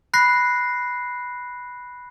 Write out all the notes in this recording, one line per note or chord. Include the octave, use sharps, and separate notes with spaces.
B5 F#6 A#6 C7